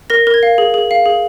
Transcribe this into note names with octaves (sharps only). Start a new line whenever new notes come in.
A#4 A#6
A#4
G#6
F5
G#4
G#4
F5
G#4